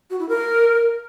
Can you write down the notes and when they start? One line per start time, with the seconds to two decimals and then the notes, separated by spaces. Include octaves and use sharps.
0.10 F#4
0.20 E4
0.29 A#4